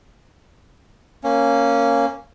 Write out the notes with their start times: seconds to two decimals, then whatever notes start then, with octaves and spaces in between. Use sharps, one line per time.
1.24 A#3 C#4